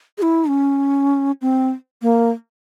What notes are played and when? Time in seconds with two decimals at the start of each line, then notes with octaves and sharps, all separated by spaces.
0.18 G#4
0.22 E4
0.49 C#4
1.41 C4
2.02 A#3